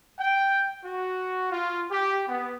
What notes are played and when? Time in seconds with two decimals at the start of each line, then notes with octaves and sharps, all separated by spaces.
0.18 G5
0.84 F#4
1.51 F4
1.90 G4
2.27 B3